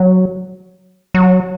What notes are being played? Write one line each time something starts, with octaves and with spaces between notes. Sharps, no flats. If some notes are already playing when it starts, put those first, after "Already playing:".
Already playing: F#3
F#3